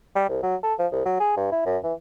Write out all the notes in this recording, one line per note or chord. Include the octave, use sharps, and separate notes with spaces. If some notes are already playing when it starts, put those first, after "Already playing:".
G3
C2
F#3
A4
F3
C2
F#3
G#4
G2
E4
F#2
E3